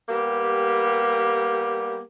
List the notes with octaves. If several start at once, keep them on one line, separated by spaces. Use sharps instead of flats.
G3 A#3 B3 G4